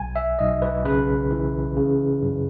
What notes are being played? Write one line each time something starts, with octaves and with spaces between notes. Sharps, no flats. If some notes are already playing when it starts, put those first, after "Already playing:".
Already playing: B1 G#5
E5
B1 D#5
B4
C#3 B4
E3
C#3
F#2